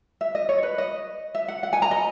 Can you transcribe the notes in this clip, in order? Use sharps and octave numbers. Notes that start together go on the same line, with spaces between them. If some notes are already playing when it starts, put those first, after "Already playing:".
E5
D#5
C#5
B4
D#5
E5
F#5
F#5
G#5
A#5
D#5